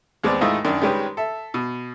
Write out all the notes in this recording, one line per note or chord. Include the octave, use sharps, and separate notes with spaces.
D#2 G#3 B3 C4 D5
G#2 D#3 A3 E4 F4 D#5
F#2 D#3 D4
D#3 G3 G#3 C#4 G4 B4
A4 E5
B2